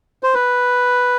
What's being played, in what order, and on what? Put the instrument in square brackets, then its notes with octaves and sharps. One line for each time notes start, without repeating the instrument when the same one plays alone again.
[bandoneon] C5
B4